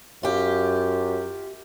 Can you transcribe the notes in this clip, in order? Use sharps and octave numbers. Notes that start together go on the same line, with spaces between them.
F#2 F4 G4